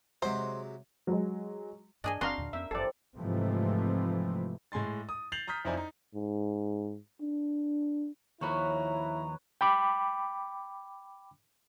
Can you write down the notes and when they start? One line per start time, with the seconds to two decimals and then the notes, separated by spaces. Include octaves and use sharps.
0.22 C3 F#3 G#3 C5
1.07 F#3 G#3
2.04 G2 D4 G#4 D#5 G#5
2.21 F#1 C4 D4 F#4 D#5 F5 A#5 C6
2.38 D#2 A#2 D3
2.53 F2 B3 C#4 A#4 E5
2.71 G1 F#2 C3 E3 F3 A4 D5
3.17 G#2 C3 E3 F3 A3 C4
4.72 A2 G#3 G#5 C6 A6
5.09 D#6
5.32 G6 A6 C7 F7 F#7
5.48 A#5 D#6 F6 G6 B6
5.65 F2 D#4 E4 C5 D5 G#5
5.77 D#4
6.15 G#2
7.21 D4
8.41 D#2 F3 E4 F#4 B4 C#5 A#5
9.61 G5 B5 D6